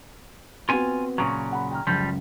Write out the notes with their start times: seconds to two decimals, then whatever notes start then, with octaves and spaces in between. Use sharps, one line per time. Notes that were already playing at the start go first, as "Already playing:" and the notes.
0.69 B3 C4 F4 F#4 G#5
1.18 A#2 C#3 F#3 C#6
1.52 F#5 B5
1.71 G5 A#5 F6
1.87 C#2 F#2 F3 G3